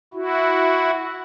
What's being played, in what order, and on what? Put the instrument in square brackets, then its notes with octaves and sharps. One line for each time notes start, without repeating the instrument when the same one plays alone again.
[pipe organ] E4 F#4